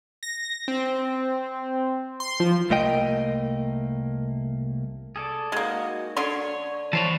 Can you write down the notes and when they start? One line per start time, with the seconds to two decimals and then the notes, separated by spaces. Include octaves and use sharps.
0.23 A#6
0.68 C4
2.20 C6
2.40 F3
2.70 C2 A3 A#3 D#5 G5
5.16 G#4 A4 D5
5.52 G#3 A#3 D#4 F#4
6.17 D3 C#5 C6
6.93 E3 C5 C#5 A5 B5